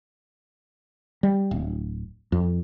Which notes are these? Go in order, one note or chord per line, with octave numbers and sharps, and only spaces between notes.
G3
D1
F2